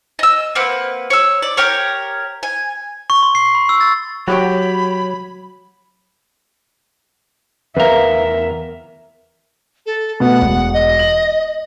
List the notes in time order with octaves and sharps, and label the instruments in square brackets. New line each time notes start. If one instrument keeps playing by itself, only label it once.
[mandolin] D#5 E6
A#3 C4 B4 F#5
C#5 E6
D5
G4 A#4 C#5
G#5
[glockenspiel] C#6
C6
C7
B5
E6
A6
[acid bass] F#3 [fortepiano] F#4 G4 G5 [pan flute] C#5 [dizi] B5
[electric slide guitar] E2 A#4 [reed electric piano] B4 F5 [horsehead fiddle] E5
[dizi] A4
[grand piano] B2 A3 B3 [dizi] F#5
[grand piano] E1
[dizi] D#5
[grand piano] F#7